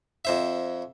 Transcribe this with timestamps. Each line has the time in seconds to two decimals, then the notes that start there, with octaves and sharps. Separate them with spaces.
0.25 F2 C5 E5